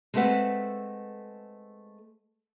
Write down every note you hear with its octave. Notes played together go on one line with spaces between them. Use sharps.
G#3 A3 C4 A4 B4 F#5